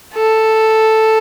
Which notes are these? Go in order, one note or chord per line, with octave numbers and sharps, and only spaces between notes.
A4